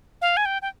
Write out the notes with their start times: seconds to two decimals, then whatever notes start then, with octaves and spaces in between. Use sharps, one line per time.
0.22 F5
0.37 G#5
0.45 G5
0.62 G5